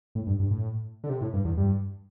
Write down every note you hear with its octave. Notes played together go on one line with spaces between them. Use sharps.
A2
G2
G2
A2
D3
C3
A2
G2
E2
G2